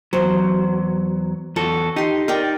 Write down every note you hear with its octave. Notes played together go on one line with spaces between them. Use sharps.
E2 G2 F#3 C5
E2 F#4 A4
D#4 G4 C6
D#4 A#4 D5 G5